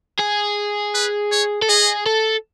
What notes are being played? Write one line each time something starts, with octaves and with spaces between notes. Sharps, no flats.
G#4
B4
C#5
A4
G#4 D#5
A4